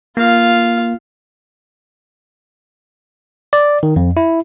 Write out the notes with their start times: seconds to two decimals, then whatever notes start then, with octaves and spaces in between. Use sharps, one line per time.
0.17 A#3 F4 F5
3.53 D5
3.83 D#3
3.96 F2
4.17 E4